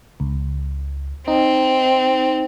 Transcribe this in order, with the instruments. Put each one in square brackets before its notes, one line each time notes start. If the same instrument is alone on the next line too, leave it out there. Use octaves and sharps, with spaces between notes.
[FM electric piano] C#2
[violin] C4 [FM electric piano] D#4